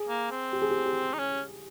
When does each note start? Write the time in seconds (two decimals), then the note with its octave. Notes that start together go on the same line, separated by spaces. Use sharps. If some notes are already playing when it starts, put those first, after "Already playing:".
Already playing: G#4
0.09 A#3
0.31 C4
0.53 G4
0.62 G#4
0.71 G4
0.85 G4
1.13 D#4
1.19 C#4